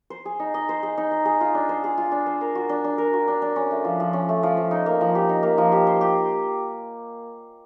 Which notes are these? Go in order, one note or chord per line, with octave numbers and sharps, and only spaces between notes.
C5
G#4
D#4
D#5
C5
G#4
D#4
D#5
G#4
F4
D4
C5
G#4
F4
D4
C5
A#4
F#4
D4
D4
A#4
F#4
D4
D4
C#4
A3
F3
F3
C#4
A3
F3
F3
D#4
A#3
F3
G4
D#4
A#3
F3
G4
C5
G4